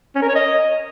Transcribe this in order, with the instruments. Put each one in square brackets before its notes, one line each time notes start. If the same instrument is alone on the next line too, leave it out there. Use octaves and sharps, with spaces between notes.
[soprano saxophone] C#4
A#4
C#5
D#5